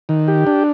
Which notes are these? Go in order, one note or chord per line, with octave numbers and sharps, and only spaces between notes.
D#3
G4
D4